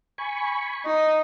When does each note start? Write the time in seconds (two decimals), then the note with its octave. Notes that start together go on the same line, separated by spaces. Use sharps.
0.18 G#5 B5 C#6
0.85 D#4